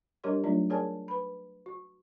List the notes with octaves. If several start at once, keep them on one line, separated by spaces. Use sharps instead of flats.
G3 D4 G4 A#4 C#5 C6
F#3 A3 D4 D#4 F4 D5
G#4 A#4 C#5 D5 G#5 A5
B4 B5
F#4